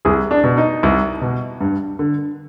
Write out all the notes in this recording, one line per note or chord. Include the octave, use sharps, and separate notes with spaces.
C2 G#4
D4
B2
D#4
C2
B2
G2
D3